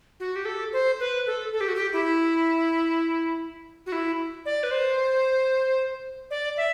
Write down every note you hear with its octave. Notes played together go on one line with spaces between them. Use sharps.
F#4
G4
A4
C5
B4
A4
A4
G4
F#4
G4
E4
F#4
E4
D5
B4
C5
D5
E5